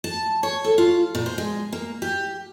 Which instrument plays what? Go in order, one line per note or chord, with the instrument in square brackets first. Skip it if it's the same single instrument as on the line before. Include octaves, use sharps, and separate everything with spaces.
[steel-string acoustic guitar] A5
C#5
A4
F4
A#2
C5
G#3
A#3
G4